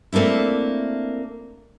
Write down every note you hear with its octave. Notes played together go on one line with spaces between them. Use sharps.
A3 A#3 C4 D4 E4